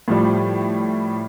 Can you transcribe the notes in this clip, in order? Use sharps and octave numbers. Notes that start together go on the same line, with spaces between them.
A2 F3 G3